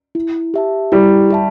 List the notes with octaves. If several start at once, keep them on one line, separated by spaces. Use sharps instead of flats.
E4
G4 E5 A5
G3 E4
G4 E5 A5